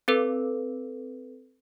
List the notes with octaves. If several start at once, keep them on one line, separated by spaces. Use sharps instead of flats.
C4 A4 B4